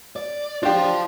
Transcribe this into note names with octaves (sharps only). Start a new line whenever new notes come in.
D5
D4 F4 G4 C5